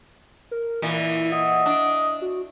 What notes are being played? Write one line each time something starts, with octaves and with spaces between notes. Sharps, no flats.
A#4
A#2 E3 E4
D#5 F#5
D4
F#4